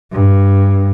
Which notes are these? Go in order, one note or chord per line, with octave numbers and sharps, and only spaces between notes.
G2